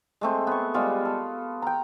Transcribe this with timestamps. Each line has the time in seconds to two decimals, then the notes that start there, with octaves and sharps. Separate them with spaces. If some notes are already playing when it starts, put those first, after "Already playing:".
0.21 G#3 A3 C4
0.47 B3 C#6
0.74 G3 G#3 B3 F4
1.05 A4
1.62 G5 A#5